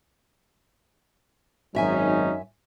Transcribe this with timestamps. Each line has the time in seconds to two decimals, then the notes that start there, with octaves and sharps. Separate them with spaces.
1.75 G#1 F#2 F#3 C#4 D#4 E5 G#5